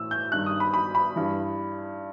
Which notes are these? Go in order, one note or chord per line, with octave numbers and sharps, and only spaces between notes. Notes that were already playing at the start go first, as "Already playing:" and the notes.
Already playing: A2 E3 E6
G6
G2 D#3 F#6
D#6
B5
B5
B5
G2 E3